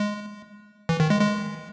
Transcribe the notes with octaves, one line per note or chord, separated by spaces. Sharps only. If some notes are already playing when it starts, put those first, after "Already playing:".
Already playing: G#3
E3
D#3
G#3
G#3